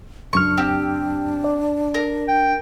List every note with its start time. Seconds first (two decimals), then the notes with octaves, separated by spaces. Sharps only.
0.33 C#2 F#2 D4 C#6 F6
0.57 C4 G4
1.44 D5
1.94 A#4
2.28 G5